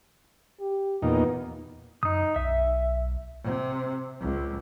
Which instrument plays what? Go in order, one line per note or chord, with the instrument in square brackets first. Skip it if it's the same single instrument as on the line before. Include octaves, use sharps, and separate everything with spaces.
[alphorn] G4
[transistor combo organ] E2 A#2 D#4 [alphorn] B3
[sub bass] F#2 [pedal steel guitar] D#4 D#6
[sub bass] B1 [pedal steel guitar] E5
[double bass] C3
C#2